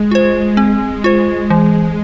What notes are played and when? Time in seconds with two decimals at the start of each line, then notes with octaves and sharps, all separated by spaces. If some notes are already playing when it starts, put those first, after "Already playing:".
Already playing: G#3
0.11 F4 C5
0.57 C4
1.04 F4 C5
1.50 E3